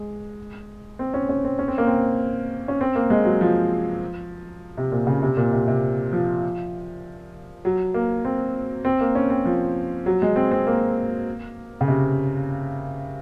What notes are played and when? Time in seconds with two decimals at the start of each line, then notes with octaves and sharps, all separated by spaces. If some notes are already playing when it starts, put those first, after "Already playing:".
Already playing: G#3
0.99 C4
1.14 C#4
1.29 C#4
1.44 C4
1.59 C#4
1.68 C4
1.78 A#3
1.87 C4
2.68 C#4
2.81 C4
2.95 A#3
3.10 G#3
3.25 F#3
3.41 F3
4.77 C3
4.92 A#2
5.07 C#3
5.22 C3
5.37 A#2
5.53 C3
5.68 C3
6.13 F3
7.65 F#3
7.94 A#3
8.25 C4
8.85 C4
9.01 A#3
9.15 C#4
9.30 C4
9.45 F3
10.06 F#3
10.22 G#3
10.36 C4
10.51 C4
10.67 A#3
11.81 C#3
11.88 C3